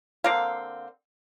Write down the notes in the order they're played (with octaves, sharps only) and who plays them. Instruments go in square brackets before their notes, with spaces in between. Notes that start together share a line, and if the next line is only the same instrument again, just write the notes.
[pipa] D3 A#3 C4 F5